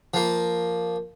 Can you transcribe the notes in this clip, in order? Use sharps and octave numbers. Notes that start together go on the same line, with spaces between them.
F3 A#3